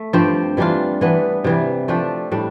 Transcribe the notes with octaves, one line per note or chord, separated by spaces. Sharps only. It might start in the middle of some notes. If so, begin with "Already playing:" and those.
Already playing: A3
G2 F3 C4 G4
E3 G3 D4 F4
E3 B3 D4
C3 E3 G3
F3 A3 D4 G4
A2 G3 D4